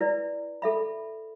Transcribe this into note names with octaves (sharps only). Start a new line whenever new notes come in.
E4 B4 D5
A4 E5 B5